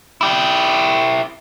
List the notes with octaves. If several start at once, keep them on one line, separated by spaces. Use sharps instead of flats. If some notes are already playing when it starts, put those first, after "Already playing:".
E4 G4